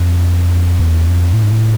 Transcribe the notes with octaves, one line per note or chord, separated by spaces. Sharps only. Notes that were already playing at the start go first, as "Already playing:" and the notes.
Already playing: F2
E2
F2
A2
G#2
A2